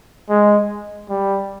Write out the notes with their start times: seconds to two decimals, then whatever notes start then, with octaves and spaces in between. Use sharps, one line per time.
0.29 G#3
1.09 G3